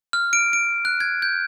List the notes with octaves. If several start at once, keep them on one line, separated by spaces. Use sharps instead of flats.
F6
D7
D7
F#6
G#6
G6